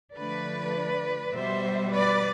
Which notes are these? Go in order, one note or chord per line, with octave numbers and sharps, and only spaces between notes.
D3 F3 A3 B4 D5
B2 G3 C5 E5
B4 D5